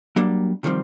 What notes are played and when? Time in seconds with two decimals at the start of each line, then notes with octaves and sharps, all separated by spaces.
0.16 F#3 G3 A#3 D4
0.63 C3 D#3 F3 G3 C4